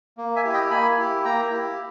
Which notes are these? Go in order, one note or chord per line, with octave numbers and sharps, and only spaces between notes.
A#3
E5 G#5
E4 G4
D#5 G5
A#3 G#5 B5
E4 G4
A#3 G5 A#5
E4 G4